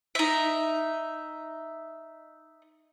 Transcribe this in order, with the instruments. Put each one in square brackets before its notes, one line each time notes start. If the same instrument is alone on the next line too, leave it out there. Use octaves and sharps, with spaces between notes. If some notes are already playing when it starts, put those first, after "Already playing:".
[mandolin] D#4 E5